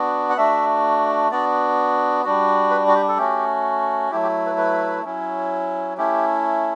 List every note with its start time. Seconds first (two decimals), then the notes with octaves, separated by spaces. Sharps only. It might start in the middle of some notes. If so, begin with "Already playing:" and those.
Already playing: B3 D4 F#4
0.30 F#5
0.37 A3 D4 F#4 E5
1.31 B3 D4 F#4 D5
2.25 G3 D4 F#4
2.70 B4
2.88 F#4
2.95 G4
3.09 A4
3.17 A3 C#4 F#4 G4
4.11 F#3 A3 E4 G4
4.23 G4
4.46 B4
4.57 B4
5.04 F#3 C#4 E4
5.97 A3 C#4 E4 G4